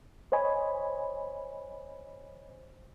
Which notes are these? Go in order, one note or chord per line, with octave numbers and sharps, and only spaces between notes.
C5 C#5 D#5 G#5 B5